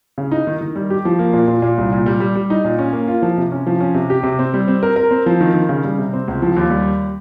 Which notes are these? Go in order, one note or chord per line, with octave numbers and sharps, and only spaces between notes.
C#3
D#4
D#3
D#3
G3
G4
F3
A#3
A#2
A#2
A#2
C2
A#2
G3
G3
G3
D#4
A#2
C#4
A#3
F4
F3
C3
C#4
F3
C#4
C3
G4
C3
C4
G3
C4
A#4
A#4
C4
F3
D#3
D#3
C#3
G3
C3
C4
C#2
F3
D#2
G3